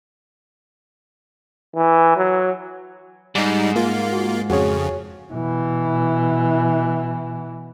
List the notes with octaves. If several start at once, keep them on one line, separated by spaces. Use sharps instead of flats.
E3
F#3
G#2 G3 D#4
A#3 F4
F#4
F2 C#3 F#4 G#4 C#5
B2 E3